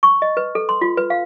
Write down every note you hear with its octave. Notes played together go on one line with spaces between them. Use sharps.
C#6
D#5
B4
A4
C6
F4
B4
F5